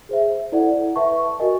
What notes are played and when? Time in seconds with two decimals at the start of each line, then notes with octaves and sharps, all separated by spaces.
0.09 G#4 C5 E5
0.52 E4 A4 D5 F#5
0.95 B4 E5 A5 C#6
1.39 F#4 A#4 D#5 G#5